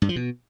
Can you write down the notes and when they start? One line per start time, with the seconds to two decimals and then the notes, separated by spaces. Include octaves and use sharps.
0.02 G2
0.09 F3
0.16 B2